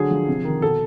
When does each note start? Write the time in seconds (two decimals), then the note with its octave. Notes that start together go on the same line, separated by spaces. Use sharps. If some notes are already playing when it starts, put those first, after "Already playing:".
Already playing: D3 F#3 G#4
0.11 F3
0.28 C3
0.45 D#3
0.62 B2 A4